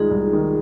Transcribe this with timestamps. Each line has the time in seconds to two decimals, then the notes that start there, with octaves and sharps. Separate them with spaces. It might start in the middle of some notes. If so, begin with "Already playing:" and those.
Already playing: C2 D#3 G#3 D#4 F4 G#4
0.11 C2
0.33 D#3